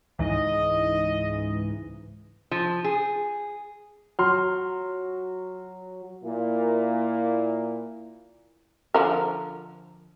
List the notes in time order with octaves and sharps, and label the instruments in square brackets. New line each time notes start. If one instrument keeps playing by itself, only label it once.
[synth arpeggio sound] C#2 G#2 E3 [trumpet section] D#5
[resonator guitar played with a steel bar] F3
G#4
[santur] F#3 [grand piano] C6 F6
[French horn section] A#2 A#3 E4
[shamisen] D3 F3 A#4